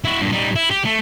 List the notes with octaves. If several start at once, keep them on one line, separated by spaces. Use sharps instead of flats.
E4 F#4
G2 A#2
G3 D#4
E4
G4
A3